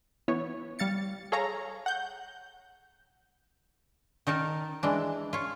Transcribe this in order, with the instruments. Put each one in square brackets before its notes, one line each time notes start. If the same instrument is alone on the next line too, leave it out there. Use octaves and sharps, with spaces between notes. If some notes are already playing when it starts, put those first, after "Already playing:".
[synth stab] E3 B3 C#5
G3 F5 A6 C#7
G#4 A4 C#5 F5 A#5
F#5 G6
[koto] D#3 D#4 A#4 A5
E3 G#3 D4
F4 C#5